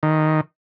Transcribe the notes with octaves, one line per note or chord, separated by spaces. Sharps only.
D#3